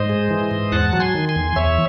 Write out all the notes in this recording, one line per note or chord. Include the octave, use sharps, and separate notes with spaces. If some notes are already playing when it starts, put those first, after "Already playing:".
Already playing: G#2 C5 D#5
G#3
E3
G#2
E2 F#5 A5
F#3
G#5 C6
D#3
G#5 C6
E2
E2 C#5 E5